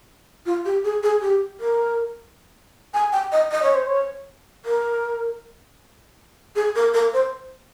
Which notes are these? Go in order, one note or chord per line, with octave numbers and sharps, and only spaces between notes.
F4
G4
G#4
G#4
G4
A#4
G#5
G5
D#5
D#5
C#5
C5
C#5
A#4
G#4
A#4
A#4
C5